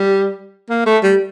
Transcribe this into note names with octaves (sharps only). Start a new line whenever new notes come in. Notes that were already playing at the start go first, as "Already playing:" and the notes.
Already playing: G3
A#3
A3
G3